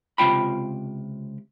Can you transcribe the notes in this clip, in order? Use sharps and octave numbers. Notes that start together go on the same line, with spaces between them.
C#2 C3 A3 F4 G5 B5